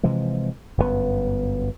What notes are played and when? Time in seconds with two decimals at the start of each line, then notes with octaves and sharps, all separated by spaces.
0.03 C3 E3 F3 G#3
0.78 G1 F#2 A#2 B3